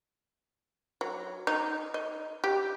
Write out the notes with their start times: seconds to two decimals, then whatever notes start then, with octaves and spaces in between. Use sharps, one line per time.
1.01 F#3
1.47 D#4
1.94 D#5
2.44 G4